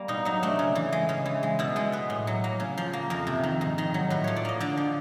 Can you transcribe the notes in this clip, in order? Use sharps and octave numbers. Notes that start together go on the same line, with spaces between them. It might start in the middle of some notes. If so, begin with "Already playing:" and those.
Already playing: G3 A#3
B2 D#4
F#3 D#4
A3 D4
C#3
E3
G#3
C#3
E3
G#3
B2 E4
G#3 A4
B3 B4
A2
F#3
A#3
C#3
F3
A#3
F2 A#4
C3
D#3
G#2
D#3
F#3
A2 B4
F3 C#5
D5
A#3 D#5
D3 D5
F3